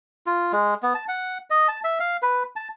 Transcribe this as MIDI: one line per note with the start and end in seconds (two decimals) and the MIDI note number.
0.26 0.52 65
0.53 0.74 56
0.83 0.93 59
0.95 1.05 81
1.08 1.38 78
1.50 1.67 75
1.68 1.80 81
1.84 1.99 76
2.00 2.17 77
2.22 2.43 71
2.56 2.68 81